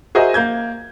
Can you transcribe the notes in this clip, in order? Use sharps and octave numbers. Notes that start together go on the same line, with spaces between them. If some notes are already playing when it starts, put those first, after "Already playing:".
F#4 G#4 A#4 C5 D#5 E5
A#3 G6 G#6